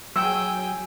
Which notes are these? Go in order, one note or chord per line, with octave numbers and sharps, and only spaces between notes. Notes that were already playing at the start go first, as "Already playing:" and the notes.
F#3 G#4 G5 E6